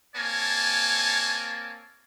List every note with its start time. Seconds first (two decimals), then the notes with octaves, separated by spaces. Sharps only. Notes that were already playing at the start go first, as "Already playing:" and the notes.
0.16 A#3 C4 C#5 G#5 A5